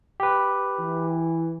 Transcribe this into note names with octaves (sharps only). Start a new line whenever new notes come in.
G4 B4
E3